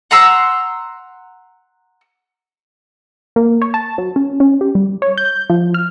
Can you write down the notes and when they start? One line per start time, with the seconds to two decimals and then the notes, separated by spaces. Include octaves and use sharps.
0.11 F#5 A#5 C6 E6
3.36 A#3
3.62 C#5
3.74 A5
3.98 F#3
4.16 C#4
4.40 C#4
4.61 G4
4.75 G3
5.02 C#5
5.18 G6
5.50 F3
5.74 F6